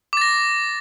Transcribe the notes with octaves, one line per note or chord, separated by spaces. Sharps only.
D6 A6 A#6